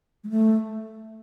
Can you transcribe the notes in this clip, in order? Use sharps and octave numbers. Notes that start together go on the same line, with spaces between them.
G#3
A3